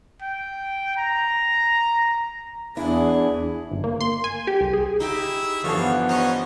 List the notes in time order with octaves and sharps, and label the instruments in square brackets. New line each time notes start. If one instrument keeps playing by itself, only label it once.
[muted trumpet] G5
A#5
[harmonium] E2 [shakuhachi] D4 [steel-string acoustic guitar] E4 [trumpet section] G#4
[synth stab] G1
A#3
C6
G#5
G4
C2
G#4
[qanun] D#4 G4 G5 [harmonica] E4 G#4 E5
[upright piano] G2 E3 F3 [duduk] D3 [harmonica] C#5 F5
[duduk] B3
[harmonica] C#4 D#5 A#5 [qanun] C5 C#6